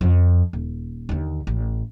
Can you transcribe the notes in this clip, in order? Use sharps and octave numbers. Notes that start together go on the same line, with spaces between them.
F2
D#1
D#2 D3
A1